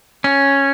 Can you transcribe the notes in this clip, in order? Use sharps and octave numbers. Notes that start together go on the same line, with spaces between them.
C#4